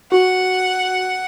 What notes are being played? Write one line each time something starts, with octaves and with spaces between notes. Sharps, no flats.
F#4 F#5